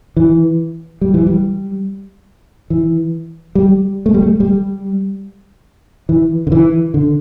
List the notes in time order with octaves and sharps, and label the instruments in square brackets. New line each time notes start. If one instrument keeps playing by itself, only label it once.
[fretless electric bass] E3
G3
E3
G3
E3
G3
A3
G3
A3
G3
E3
D3
E3
D3